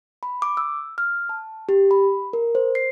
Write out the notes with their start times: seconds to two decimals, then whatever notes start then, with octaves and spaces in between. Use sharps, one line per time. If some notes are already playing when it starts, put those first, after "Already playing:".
0.23 B5
0.42 D6
0.57 E6
0.98 F6
1.29 A5
1.69 G4
1.91 B5
2.33 A#4
2.55 C5
2.75 C7